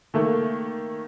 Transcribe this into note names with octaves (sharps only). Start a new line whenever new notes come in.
D#3 A3 A#3